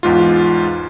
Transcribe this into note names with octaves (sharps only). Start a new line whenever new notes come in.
E2 G#2 F4